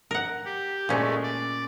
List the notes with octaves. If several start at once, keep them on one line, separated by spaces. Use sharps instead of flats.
A#4 F#5
G4
A#2 G#3 A3 C#4
D5